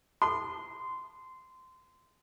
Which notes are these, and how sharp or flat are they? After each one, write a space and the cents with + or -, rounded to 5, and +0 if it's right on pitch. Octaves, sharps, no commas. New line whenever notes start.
C6 -20